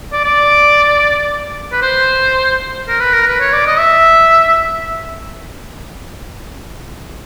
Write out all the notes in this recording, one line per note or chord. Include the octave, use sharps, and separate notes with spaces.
D5
D5
B4
C5
A#4
B4
A#4
B4
C#5
D5
D#5
E5